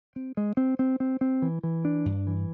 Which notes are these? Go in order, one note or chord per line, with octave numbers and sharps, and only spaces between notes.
C4
G#3
C4
C4
C4
C4
E3
E3
D4
G2
E3